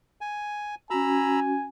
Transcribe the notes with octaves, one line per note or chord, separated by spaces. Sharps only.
G#5
C#4 F#4 G#5 A#5 B5 E6